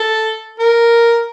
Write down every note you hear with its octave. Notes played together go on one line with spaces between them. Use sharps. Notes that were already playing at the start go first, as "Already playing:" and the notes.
Already playing: A4
A#4